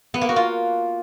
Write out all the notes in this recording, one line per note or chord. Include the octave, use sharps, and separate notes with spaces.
B3
A#3
F#4
F4